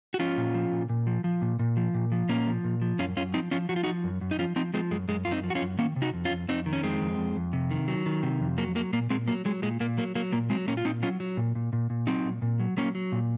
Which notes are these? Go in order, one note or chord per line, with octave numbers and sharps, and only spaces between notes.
F#4
F3 C#4 F4
A#2
F3
A#2
A#2
F3
F3
A#2
A#2
F3
A#2
F3
A#2 A#3 C#4
F3
A#2
F3
F#2 C#4 F4
F#2 C#4 F4
F3 C4 D#4
F3 C#4 F4
F3 F#4
F4
D#4 F#4
F3
F#2
F#2
D#4
F3 C#4 F4
F3 C4 D#4
F3 G#3 C4
F#2 G#3
F#2 G#3
F#2 F4
C4 D#4
F3
F#4
C#4 F4
F#2
D#3 A#3 C#4
C3
D#4 F#4
F2
C#4 F4
F2
F2 C4 D#4
D#3
C#4
F2 G#3 C4
F2
F2
F2
C3
D#3
F#3
D#3
C3
F2
F#3 A#3
F#3 A#3
A#2 A#3
A#2 G#3 C4
F#3 A#3
F#3 G#3
A#2 G#3
A#2 A#3
F#3 A#3
F#3 A#3
A#2 A#3
F#3 G#3 C4
A#2 A#3 C#4
F4
A#2 C4 D#4
F#3 C#4 F4
F#3
A#2
A#2
A#2
A#2
F#3 C4 D#4
A#2
A#2
F#3
F#3 A#3 C#4
F#3
A#2